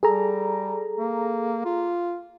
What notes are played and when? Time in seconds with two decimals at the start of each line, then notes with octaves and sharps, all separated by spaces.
0.03 G3 G#4 A4 A#5
0.98 A#3
1.65 F4